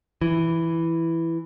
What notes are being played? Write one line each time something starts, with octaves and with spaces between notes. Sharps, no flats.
E3